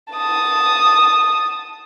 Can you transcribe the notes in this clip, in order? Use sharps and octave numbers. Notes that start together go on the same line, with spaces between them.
A5 D#6